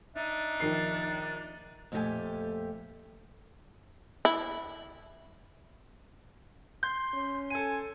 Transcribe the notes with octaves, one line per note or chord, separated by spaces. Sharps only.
D4 D#4 E5
A#1 D#3 C7
F2 A#2 A3 F#4 G4 G#5
E4
C6 G6
C#4
A4 G#5 D#7